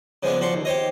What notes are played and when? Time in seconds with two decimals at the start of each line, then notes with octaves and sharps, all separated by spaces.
0.23 C#3 F3 G#3 B3 D4
0.41 F3 F#4 D5 C6 C#6
0.54 D#2
0.65 G4 C5 C#5 D#5